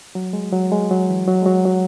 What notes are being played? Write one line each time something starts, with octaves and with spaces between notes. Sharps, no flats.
F#3
G#3
F#3
G#3
F#3
E3
F#3
G#3
F#3
F#3